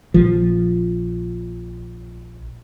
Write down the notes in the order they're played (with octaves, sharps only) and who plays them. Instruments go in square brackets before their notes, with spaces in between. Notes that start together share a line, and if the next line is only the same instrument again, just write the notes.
[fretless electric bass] A#1 F3